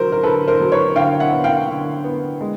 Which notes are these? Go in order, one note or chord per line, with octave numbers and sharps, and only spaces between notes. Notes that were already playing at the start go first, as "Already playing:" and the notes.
Already playing: D3 F#3 A#4 C5
A#4
D3 A4 B4
A#4 C5
F#3
B4 C#5
D3 F5 G5
E5 F#5
B3
F5 G5
D3
B3
G#3